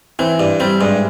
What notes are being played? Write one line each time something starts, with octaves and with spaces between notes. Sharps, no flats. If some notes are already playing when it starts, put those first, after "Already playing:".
E3 C4
G2
G3 C4
G2 G#3